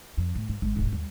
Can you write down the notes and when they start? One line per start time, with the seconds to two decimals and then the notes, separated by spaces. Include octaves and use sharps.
0.17 F2
0.35 A2
0.49 G#2
0.62 G#1 G#3
0.76 D1 G#2
0.92 D#2 G3